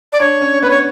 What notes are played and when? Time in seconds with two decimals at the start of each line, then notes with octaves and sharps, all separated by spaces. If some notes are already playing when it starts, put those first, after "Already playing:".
0.13 D5
0.20 D4 C#5
0.41 C#4
0.62 B3 B4
0.70 C#5